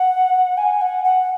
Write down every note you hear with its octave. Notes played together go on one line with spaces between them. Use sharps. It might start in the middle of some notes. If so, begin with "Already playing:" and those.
Already playing: F#5
G#5
F#5
F#5